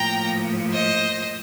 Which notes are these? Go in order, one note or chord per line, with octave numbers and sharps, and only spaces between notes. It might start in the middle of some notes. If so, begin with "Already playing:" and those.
Already playing: A2 F3 A#3 G5 A#5
C5 D#5